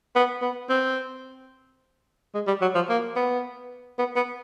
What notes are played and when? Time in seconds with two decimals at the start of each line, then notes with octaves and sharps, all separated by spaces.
0.15 B3
0.42 B3
0.69 C4
2.34 G#3
2.47 G3
2.61 F#3
2.75 F3
2.89 A#3
3.16 B3
3.99 B3
4.16 B3